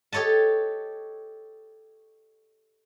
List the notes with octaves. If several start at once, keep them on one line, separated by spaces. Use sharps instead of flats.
G4 A4 C#5 D#5 A5